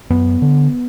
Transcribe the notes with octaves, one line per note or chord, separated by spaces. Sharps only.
F#2 B3
D3